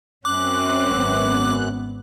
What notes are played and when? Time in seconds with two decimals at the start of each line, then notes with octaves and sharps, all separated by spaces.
0.25 F#2 C4 C#4 D6 F#6
0.85 G#1 B3